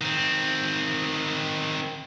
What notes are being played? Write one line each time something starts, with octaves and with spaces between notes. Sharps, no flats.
D#3 C4